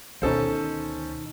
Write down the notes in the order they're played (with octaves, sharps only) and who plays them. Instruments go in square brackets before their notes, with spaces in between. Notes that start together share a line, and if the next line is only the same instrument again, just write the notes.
[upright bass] D2 B2 [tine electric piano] D#3 D#4 [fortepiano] C#4 A4 C5